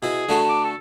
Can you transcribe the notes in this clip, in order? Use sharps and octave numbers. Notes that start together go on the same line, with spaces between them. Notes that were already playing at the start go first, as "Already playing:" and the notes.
B2 E4 G#4
D3 A3 F#4 A5
D6
A4